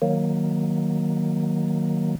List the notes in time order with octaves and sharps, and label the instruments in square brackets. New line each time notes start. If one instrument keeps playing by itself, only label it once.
[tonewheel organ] D#3 F#3 A#3